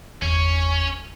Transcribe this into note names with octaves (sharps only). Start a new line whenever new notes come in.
G1 E2 C#4 G#6